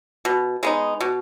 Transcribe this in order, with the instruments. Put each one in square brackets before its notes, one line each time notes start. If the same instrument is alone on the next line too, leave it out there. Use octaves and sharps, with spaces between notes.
[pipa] B2
G#3 B3 D#4
B2